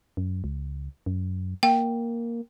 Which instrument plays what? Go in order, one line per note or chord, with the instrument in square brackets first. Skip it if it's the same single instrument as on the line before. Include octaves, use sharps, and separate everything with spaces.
[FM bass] F#2
C#2
F#2
[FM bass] A#3 [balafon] G5